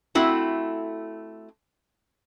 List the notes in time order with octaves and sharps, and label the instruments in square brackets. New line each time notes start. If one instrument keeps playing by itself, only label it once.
[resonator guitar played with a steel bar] A3 C4 E4 F#4